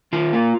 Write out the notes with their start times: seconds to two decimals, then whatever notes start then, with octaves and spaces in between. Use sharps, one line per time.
0.13 D#3 F4
0.33 A#3